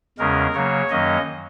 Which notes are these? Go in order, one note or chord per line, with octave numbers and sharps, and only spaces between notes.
E2 C#3 G#3 C#4 A#4
C#3 F#3 A#3 C#5
F#2 D#3 F#3 A#3 C#4 D#5